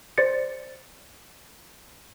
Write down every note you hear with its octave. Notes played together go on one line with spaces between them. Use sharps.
C5 D5 A6 C#7